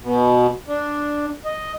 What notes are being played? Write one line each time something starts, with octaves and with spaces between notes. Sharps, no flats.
B2
D4
D#5